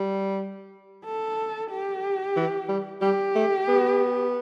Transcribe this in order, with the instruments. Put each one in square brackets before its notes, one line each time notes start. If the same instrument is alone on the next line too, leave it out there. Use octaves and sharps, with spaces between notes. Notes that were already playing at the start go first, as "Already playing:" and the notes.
Already playing: [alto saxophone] G3
[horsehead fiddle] A4
G4
[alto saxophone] E3
G3
[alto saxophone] G3 [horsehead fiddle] G4
[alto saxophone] A3
B3